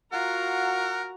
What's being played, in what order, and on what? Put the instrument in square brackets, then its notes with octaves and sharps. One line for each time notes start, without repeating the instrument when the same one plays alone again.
[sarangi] F4 [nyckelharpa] F#4 A#5 [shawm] A#4 [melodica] F#5